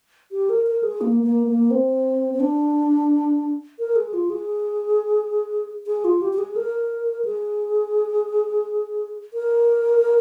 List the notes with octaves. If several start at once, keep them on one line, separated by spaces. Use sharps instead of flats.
G4
A#4
A#4
G#4
A#3
A#3
A#3
C4
C4
D4
A#4
G#4
F4
G#4
G#4
F4
G4
G4
G#4
A#4
G#4
A#4